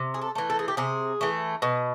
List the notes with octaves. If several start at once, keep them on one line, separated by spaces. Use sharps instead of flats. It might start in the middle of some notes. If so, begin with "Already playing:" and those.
Already playing: C3
G#4
A4
E3 A3
A4
G#4
G4
C3 G#4
E3 A3
B2